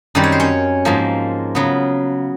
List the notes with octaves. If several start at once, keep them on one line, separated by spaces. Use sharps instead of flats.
F#2 D#3 G3 C4 D5
C#5
C5
C#4 C#5
G#2 F3 A#3
C#3 F#3 B3